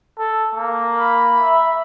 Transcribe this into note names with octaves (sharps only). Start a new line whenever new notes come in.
A4
A#3
B5
E5